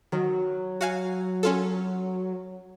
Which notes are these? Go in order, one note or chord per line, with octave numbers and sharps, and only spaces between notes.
D#3 F#3
F#4 F5 G#5
C#4 F4 A4